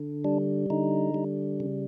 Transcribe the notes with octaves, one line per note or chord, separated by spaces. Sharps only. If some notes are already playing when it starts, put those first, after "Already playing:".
Already playing: D3
G3 D4
D3 D#4
G3
C#3